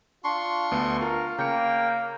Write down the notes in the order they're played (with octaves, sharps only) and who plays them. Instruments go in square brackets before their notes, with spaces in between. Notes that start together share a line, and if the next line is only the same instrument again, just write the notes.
[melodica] D4 C6 C#6 [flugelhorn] F4
[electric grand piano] D2 B3
[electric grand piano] F4 [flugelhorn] A#4
[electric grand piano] C#3 C#7 [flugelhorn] A#3 [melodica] G5